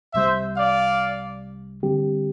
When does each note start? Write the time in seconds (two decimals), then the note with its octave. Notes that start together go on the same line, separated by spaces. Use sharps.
0.14 C2 C3 G3 C5 E5
0.56 D5 F5
1.83 D3 G3 C4 G4